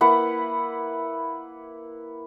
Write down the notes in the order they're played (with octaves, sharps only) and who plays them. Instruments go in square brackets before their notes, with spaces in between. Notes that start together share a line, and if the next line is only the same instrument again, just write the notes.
[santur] A#3 E4 B4 F#5